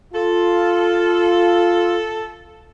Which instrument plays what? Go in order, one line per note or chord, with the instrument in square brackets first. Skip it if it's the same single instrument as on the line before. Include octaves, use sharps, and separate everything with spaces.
[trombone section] F4 [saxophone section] A4